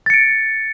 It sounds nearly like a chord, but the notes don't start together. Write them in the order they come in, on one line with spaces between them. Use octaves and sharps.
A6 C#7 D7